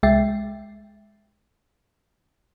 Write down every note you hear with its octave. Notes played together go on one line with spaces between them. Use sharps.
C2 G#3 E5 G5 A6 C7